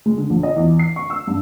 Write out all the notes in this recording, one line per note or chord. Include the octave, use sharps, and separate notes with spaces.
G#3
D3
A#1
D#5
E2
C7
C#6
E6
G2